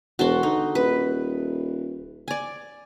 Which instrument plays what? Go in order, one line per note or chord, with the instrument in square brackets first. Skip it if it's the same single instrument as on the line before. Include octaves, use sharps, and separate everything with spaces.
[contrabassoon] E1 [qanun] F#4 A5 C6
[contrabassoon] D3 [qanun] D#4
[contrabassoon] D#1 [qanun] B4
[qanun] D5 G#5